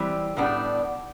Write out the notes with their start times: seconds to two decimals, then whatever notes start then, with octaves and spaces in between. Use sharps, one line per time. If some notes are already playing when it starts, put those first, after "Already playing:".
Already playing: E3 G3 C4
0.37 A2 G3 B3 D4